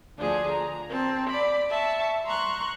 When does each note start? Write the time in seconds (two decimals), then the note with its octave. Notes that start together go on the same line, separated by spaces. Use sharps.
0.19 D2 F3 D4 G#4
0.51 A#5
0.89 C4 A5
1.29 D5 B5 D6
1.70 E5 A5 C#6
2.25 A#5 C6 C#6 F#6